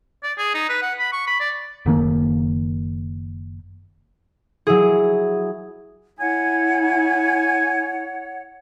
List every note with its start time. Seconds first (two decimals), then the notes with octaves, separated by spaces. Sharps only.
0.23 D5
0.38 G#4
0.54 D#4
0.69 B4
0.82 F#5
0.99 B5
1.12 C#6
1.27 B5
1.40 D5
1.86 F#1 D#3 A#3
4.67 F#3 E4 G#4
6.20 E4 C#5 F#5 G#5